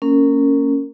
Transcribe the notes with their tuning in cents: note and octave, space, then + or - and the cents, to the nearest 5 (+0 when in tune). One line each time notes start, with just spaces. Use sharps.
A#3 -15 C#4 +0 A#4 -20